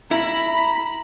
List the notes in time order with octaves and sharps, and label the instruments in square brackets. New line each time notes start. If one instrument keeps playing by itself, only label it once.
[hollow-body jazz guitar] E4 [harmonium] A#5 [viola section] B5